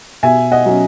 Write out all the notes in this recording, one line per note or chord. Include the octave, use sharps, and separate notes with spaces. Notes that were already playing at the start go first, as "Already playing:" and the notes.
B2 E5 G#5
D#5 F#5
F#3 C#4